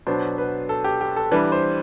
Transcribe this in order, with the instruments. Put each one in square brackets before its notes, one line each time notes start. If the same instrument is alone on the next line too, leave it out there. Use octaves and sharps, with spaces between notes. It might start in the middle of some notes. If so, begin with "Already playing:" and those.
[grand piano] B2 F#3 B3 D4 C5
B4
A4
G4
G4
A4
E3 G3 D4 B4
C5